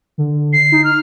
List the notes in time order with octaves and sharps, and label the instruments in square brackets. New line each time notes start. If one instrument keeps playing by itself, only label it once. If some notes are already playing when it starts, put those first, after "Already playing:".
[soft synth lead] D3
[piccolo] C7
[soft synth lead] D#4
[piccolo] F6